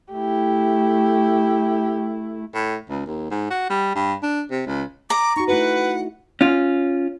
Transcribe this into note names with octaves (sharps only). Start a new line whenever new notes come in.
A3 E4 G4
A2
C#2
D#2
G#2
F#4
G3
G2
D4
C3
C#2
A#5 D6
D#4 F#4 C#6
A3 E4 F#4 B4 F#5
C#4 F4